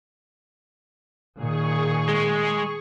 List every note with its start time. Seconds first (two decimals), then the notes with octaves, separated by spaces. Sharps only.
1.37 A#2 D#3 G#4 C#6
2.09 G#3